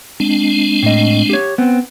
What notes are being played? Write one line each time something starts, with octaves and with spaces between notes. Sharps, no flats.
G#3 C4 D4
A2 D#5
G4 C#5
B3 C4